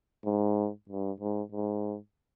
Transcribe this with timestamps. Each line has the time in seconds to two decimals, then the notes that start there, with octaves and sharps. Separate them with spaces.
0.25 G#2
0.89 G2
1.20 G#2
1.52 G#2